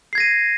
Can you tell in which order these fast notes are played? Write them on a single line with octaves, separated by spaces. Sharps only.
C7 G#6 A#6 D#7